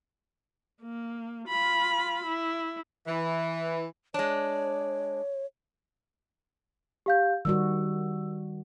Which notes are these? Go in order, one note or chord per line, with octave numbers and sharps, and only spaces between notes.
A#3
F4 B5
E4
E3
G#3 D4 C#5
G4 F5 G6
D#3 G3 F#4 E6